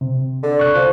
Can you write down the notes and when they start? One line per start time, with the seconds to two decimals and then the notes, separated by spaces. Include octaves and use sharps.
0.01 C3
0.43 D3
0.59 C#6 F#6
0.75 F3